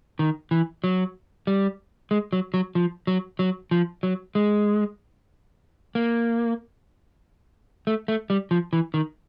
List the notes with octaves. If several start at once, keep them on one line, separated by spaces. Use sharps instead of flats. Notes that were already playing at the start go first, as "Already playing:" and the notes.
D#3
E3
F#3
G3
G#3
F#3
F#3
F3
F#3
F#3
F3
F#3
G#3
A#3
A3
A3
G3
F3
E3
D#3